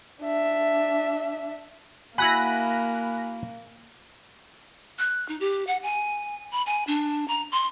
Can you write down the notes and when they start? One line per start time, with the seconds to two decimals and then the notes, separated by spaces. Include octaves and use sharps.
0.22 D4 E5
2.18 A#3 E4 F#4 F#5 G#5 B5 F#6 A#6
4.99 F#6
5.29 D#4
5.40 G4
5.67 F#5
5.83 G#5
6.51 B5
6.66 G#5
6.87 D4
7.28 A#5
7.52 C6